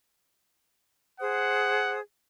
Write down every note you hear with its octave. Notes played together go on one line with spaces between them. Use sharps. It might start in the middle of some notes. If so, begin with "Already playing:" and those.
G#4 C5 F#5 D#6